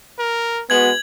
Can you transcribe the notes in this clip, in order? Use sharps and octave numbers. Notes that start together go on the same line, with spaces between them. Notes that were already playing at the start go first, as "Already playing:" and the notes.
A#4
G#3 B3 F#4 G#6 F#7